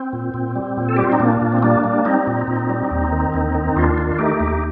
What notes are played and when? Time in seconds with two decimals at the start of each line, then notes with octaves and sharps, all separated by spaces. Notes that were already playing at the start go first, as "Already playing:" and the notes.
Already playing: C4
0.13 A#2
0.34 A#2
0.55 G3
0.77 A#2
0.89 A4
0.96 G3 G4
1.04 F4
1.12 D#4
1.20 A#2 A#3 D4
1.41 A#2
1.52 C4
1.63 G3 A#3 D4
1.84 G3
2.05 G3 C4 D#4
2.27 A#2
2.47 A#2
2.70 G3
2.91 D#2
3.12 D#3
3.34 D#2
3.55 D#3
3.76 D#2 D4 F4
3.98 D#3
4.19 A3 D#4 G4
4.40 D#2